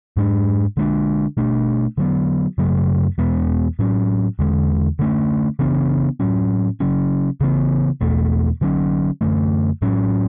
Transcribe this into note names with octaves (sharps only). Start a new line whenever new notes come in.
G#2 G#3 D4
D3 G#3 D4
B2 A3 D4
D3 F#3 B3
F#2 C#3 F#3 A3
E2 B2 G#3 B3
A2 F#3 C#4
E2 D3 G#3
D3 A3 C#4
C#3 E3 B3 D4
A2 F#3 C#4
C#3 F#3 C#4
C#3 E3 B3
E2 B2 A3
D3 F#3 C#4
F#2 D3 A3
A2 F#3 C#4